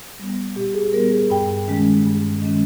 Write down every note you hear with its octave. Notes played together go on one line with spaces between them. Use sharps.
G3 B3
A#2 G4
G#4
G3 B3 A#4
G#4
G2 G5
D#3 G#3 C#4
G2
D#3 G#3 C#4